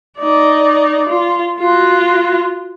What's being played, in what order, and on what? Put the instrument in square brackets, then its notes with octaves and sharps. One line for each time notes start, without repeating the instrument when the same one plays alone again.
[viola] D#4 D5
F4
F4 F#4